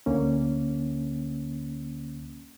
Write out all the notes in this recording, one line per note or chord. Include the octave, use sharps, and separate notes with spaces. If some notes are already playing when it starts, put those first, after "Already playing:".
D2 D3 A#3 C#4